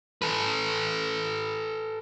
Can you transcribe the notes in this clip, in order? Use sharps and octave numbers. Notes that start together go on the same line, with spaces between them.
A4 B4